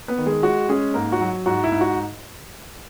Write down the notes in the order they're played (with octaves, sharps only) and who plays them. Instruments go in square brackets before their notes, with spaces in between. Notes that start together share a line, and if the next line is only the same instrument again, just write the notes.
[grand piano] B3 B4
D#3
G#3 G#4
G#3 F#4
G#3 C#4 G#4
G#2 A#3 A#4
F#4
F#3
G#2 F#4
E4
G#2
F#4